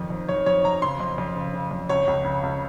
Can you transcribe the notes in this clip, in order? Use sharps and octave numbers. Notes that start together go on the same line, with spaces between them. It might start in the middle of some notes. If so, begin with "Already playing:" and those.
Already playing: F2 D#3
F2
F2 C#5
F2 C#5
F2 A#5
C#3 C6
F2
F2
C#3
C#3
F2
C#2 C#5
C#2
C#3
C#2